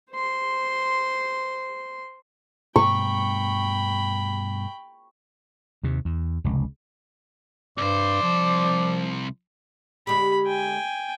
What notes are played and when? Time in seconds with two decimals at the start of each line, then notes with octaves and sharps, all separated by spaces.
0.12 C5 C6
2.76 G2 B2 A3 G5 B5 C#6
5.83 D#2 C3
6.05 E2
6.44 F1 C#2
7.78 C2 G2 C5 D5
8.22 F3
10.07 D3 G#3 G4 B5
10.46 G5 G#5